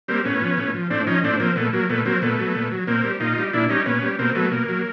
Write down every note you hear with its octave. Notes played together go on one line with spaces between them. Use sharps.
G3 A#3 C4
A2 B3 C#4
F3
A2
F3
A2 C4 D4
F3 C#4 D#4
A2 C4 D4
F3 A#3 C4
A#2 A3 B3
F#3 A#3
A#2 A3 B3
F#3 A#3 C4
A#2 A3 B3
F#3
A#2
F#3
A#2 A#3 C4
G3
A#2 D#4 F4
G3
A#2 D4 E4
G3 C#4 D#4
A#2 B3 C#4
G3
B2 A#3 C4
F#3 A3 B3
B2 A#3
F#3